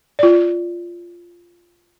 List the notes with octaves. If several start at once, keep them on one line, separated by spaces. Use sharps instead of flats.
F4 D5